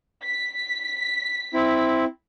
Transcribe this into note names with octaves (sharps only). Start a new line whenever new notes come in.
B6
C4 E4